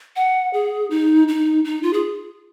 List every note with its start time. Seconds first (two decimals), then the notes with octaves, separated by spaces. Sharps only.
0.16 F#5
0.53 G#4
0.90 D#4
1.28 D#4
1.65 D#4
1.83 F4
1.93 G#4